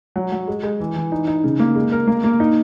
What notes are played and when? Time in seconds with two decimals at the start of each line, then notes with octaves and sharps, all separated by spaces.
0.16 F#3
0.32 F#3
0.48 G#3
0.63 G#3
0.80 E3
0.96 E3
1.12 D#4
1.27 D#4
1.44 C#3
1.60 A#3
1.76 G#3
1.92 A#4
2.07 A#3
2.24 A#3
2.40 D#4